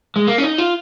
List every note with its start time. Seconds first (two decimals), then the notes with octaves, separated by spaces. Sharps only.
0.16 G#3
0.27 A#3
0.38 C#4
0.43 D#4
0.58 F4